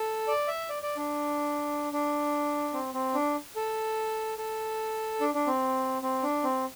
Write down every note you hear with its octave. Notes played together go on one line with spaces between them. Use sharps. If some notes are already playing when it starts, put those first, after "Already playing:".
Already playing: A4
D5
E5
D5
D5
D4
D4
C4
C4
D4
A4
A4
D4
D4
C4
C4
D4
C4